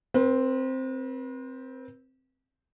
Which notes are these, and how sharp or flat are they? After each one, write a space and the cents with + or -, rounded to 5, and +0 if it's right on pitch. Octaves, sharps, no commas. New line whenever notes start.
C4 +0 B4 -40